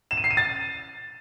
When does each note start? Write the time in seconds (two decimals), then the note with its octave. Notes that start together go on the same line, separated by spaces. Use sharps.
0.11 E7
0.17 D#7
0.24 C7
0.31 D#7
0.37 A6